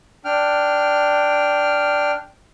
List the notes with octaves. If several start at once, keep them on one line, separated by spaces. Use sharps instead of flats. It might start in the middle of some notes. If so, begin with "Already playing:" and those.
D4 G5 F6